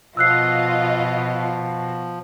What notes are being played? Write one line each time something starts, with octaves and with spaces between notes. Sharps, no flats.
B2 F3 F4 D#5 E6 F#6 C7